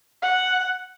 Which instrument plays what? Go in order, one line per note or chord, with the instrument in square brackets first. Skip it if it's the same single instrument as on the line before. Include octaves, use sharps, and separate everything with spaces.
[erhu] F#5